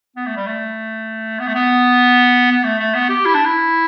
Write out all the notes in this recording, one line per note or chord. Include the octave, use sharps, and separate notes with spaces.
B3
A3
G3
A3
B3
A3
B3
B3
A3
A3
B3
G4
E4
D4
E4